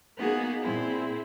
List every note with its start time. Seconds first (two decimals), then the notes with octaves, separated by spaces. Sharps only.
0.18 A#3 B3 D#4 F#4 G#4
0.61 A#2 C4 E4 G#4